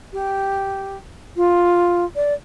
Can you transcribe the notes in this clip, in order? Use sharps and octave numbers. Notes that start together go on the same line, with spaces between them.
G4
F4
D5